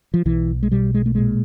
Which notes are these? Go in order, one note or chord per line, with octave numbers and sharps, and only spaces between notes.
F3
B1 E3
G#3
B2 G3
G#3
A3
A#2 G#3